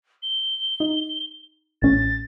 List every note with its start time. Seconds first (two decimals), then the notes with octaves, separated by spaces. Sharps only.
0.23 G7
0.80 D#4
1.82 A1 A2 C#4 A6